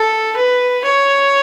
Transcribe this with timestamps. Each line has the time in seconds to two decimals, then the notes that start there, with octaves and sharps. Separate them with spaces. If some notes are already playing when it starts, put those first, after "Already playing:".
Already playing: A4
0.37 B4
0.85 C#5